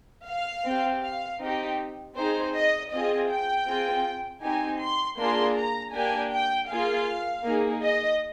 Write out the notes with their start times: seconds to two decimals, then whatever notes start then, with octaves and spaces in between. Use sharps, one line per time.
0.27 F5
0.65 C4 G4
1.03 F5
1.41 C4 D#4 G4
2.16 C4 D#4 G#4 C5
2.55 D#5
2.91 C4 F4 G#4 D#5
3.29 G5
3.67 C4 F4 G#4
4.43 C4 D#4 G4 G#5
4.81 C6
5.18 A#3 D4 F4 G#4 C6
5.56 A#5
5.94 A#3 D4 G4 G#5
6.31 G5
6.69 A#3 F4 G#4 F5
7.44 A#3 D#4 G#4
7.83 D#5